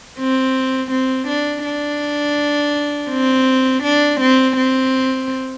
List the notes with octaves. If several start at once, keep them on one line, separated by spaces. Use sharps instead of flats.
C4
C4
D4
D4
C4
D4
C4
C4